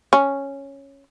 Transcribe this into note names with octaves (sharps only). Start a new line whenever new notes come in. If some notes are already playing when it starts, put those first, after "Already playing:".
C#4